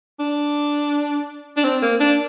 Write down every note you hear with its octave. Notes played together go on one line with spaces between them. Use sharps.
D4
D4
C4
A#3
D4